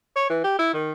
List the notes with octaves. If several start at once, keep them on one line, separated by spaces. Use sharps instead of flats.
C#5
E3
G4
E4
D#3